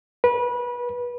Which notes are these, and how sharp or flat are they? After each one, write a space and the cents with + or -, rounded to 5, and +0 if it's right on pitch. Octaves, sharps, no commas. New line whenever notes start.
B4 -25